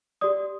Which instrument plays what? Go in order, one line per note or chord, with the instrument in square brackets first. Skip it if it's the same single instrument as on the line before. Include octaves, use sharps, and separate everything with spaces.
[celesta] G4 D5 D#6